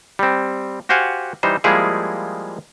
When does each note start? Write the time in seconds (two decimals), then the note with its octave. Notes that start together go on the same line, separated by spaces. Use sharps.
0.19 G3 C4
0.89 F#4 G4 C5 F5 F#5 G#5
1.43 E3 G3 D#4 C5
1.64 F3 G3 G#3 A#3 E4 G#4